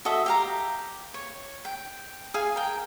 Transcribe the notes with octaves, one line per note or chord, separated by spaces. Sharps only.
F#4 A4 D#5 E5
G4 F5 A#5
C#5
G5
G#4 F5 G#5
A#4 G5